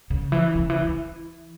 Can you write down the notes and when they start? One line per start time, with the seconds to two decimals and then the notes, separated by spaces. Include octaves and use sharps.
0.10 C#3
0.32 E3
0.55 C#3
0.70 E3
0.85 E3